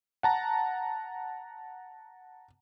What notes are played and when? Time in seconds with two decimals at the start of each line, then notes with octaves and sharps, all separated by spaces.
0.23 F#5 A5 A#5